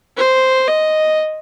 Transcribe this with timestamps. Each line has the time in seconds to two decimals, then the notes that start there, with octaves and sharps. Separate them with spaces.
0.17 C5
0.68 D#5